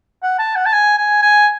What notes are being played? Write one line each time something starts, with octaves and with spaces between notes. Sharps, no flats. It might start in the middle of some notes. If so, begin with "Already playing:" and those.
F#5
A5
F#5
A5
G#5
G#5
G#5